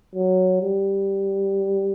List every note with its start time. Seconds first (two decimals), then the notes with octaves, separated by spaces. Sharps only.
0.15 F#3
0.62 G3